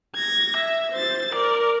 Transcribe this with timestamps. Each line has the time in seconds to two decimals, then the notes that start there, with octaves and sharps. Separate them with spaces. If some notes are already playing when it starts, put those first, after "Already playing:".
0.15 G#6 A#6
0.57 E5
0.92 C5 A6
1.34 A#4 D5